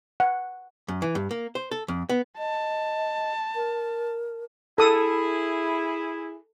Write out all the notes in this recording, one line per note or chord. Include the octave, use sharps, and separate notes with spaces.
F#5
F#2
E3
G2
A#3
C5
A4
F2
B3
D#5 A5
A#4
E4 G#4 A4 D#6